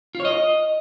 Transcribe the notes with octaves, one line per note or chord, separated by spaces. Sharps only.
F4
C#5
D#5